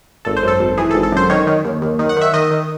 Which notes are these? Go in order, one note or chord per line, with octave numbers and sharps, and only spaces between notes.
G#1 A4
C5
F#2 A4
G#1
E3 G#4
A4
G#1
A4
F#2 C5
D#3 C#5
D#3
D#2
D#2
D#3
F#5
D#3 E5
D#3 D#5
D#3